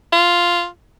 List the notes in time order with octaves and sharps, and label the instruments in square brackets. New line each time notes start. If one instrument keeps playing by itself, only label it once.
[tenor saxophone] F4